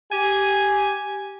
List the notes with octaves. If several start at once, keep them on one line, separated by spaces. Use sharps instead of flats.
G4 G#5